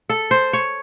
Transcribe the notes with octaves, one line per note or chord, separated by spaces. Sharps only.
A4
C5
C#5